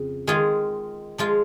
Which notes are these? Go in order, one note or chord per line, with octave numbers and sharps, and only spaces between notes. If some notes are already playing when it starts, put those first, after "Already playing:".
Already playing: F2 C#3
D#3 G#3 F4 G#4
F3 G#3 F4